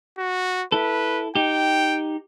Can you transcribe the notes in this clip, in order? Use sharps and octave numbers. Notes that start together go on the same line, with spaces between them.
F#4
E4 A4 B4
D#4 G4 G5